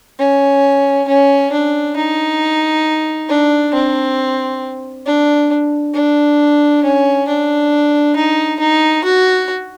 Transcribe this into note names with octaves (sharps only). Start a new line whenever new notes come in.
C#4
C#4
D4
D#4
D4
C4
D4
D4
C#4
D4
D#4
D#4
F#4